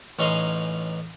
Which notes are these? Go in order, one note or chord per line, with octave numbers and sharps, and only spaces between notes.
A1 C#4 D#4 G#4 A#5 C6